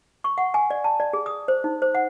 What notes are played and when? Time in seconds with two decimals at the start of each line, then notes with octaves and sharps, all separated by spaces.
0.24 C#6
0.38 F#5
0.54 G#5
0.70 D5
0.84 A5
1.00 D5
1.13 G#4
1.26 D#6
1.48 C5
1.64 D#4
1.82 C5
1.95 F#5